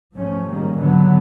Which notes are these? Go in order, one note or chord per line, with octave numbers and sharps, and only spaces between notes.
G#2 F3 A3 C#4
G#2 D#3 G3 A#3
D3 F#3 B3